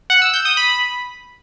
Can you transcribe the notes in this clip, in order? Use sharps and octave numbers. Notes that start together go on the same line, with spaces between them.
F#5
E6
G6
D#6
B5